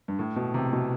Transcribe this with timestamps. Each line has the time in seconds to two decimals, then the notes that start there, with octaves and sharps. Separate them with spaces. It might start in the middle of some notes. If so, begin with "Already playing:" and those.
0.08 G2
0.19 A2
0.36 B2
0.54 C3
0.73 B2